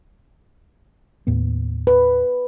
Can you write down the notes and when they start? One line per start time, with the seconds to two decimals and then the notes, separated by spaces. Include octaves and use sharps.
1.27 D#2 A2 B3
1.87 B4